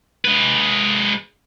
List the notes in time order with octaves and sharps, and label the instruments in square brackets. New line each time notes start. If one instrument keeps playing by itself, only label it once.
[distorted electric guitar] G#3 B4